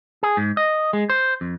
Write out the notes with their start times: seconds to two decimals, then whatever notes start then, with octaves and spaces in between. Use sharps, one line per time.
0.23 G#4
0.37 G#2
0.57 D#5
0.93 G#3
1.10 C5
1.41 F2